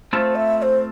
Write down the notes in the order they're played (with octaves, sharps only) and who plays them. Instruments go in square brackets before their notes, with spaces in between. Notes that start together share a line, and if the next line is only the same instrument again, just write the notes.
[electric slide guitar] A3 C4 F4 A4 [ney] C5
[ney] E5
E5
C5